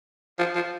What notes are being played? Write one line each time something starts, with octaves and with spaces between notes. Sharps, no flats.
F3
F3